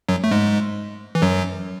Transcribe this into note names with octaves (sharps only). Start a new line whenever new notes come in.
F#2 F#3
A3
G#2 G#3
E3
F#2 F#3